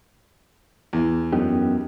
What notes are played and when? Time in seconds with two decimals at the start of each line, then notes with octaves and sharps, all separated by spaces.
0.93 E2
1.33 F#2 B3 D#4 G4